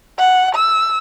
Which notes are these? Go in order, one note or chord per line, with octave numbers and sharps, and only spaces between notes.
F#5
E6